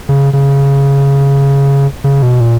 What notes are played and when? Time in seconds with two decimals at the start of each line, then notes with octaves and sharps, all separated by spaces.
0.09 C#3
0.33 C#3
2.04 C#3
2.23 B2
2.41 A#2